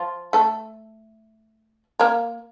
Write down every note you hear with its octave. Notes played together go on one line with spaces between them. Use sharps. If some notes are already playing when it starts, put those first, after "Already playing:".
Already playing: F3 F4
A3 A4
A#3 A#4